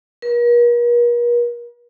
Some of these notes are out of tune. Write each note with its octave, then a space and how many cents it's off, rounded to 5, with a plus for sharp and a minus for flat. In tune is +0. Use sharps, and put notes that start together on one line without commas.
A#4 +45